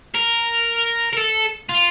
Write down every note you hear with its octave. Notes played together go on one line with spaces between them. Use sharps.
A#4
A#4
A4
F4